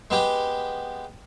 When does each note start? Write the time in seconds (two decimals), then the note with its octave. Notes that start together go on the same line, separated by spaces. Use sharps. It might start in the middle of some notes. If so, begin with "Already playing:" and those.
0.11 G#3 B3 G4 G5